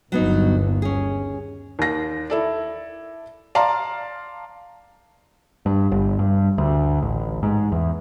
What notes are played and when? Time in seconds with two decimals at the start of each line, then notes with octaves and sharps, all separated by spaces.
0.12 G1 D#2 F#3 B3 D#4
0.82 C#4 G#4
1.79 D#2 A#6
2.30 E4 A4 D5
3.55 D5 F5 A5 A#5 C6
5.66 G2
5.92 G1
6.19 G2
6.58 D2
7.02 A1
7.43 G#2
7.72 E2